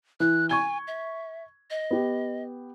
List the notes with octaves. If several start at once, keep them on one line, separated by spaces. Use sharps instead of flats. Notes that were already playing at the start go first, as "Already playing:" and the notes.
E3 F#6
G#5 C#6 G#6 G7
E5
D#5
B3 G4